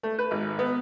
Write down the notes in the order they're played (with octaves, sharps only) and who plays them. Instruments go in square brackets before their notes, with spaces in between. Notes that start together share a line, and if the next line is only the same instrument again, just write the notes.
[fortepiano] A3
B4
G#1
B3